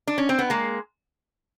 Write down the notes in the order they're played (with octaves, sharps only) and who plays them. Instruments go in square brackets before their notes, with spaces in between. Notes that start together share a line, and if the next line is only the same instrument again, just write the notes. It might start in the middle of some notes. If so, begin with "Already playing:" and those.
[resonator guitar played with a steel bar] D4
C#4
C4
B3
G#3 A#3